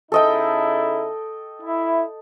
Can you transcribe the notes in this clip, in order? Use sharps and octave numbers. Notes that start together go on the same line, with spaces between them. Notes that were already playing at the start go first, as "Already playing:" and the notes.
C#3 D#4 E4 A4 D#5 G5
E4